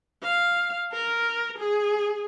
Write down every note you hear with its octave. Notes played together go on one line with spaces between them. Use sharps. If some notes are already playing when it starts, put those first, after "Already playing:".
F5
A#4
G#4